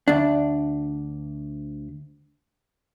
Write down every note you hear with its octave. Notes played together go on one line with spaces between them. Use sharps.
D2 D4